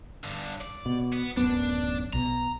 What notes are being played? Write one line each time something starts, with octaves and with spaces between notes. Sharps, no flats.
G2 D3
D5
B2
B3
D1 F#2 B3 D4
B1 B2 A#5